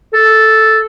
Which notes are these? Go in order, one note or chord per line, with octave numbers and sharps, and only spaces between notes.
A4